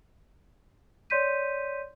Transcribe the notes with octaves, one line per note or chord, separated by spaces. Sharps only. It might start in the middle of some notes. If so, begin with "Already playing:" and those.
C#5 D5 C6 G6 B6 D#7